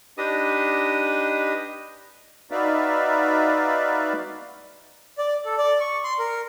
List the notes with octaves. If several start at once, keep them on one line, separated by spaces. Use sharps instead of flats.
D4 D#4 G4 B4 D#5 D#6
D#4 F#4 B4 D5 E5 F5
D5
A4
D5
C#6
C6
A#4